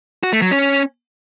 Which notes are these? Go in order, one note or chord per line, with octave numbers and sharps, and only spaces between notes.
F#4
A3
F#3
C#4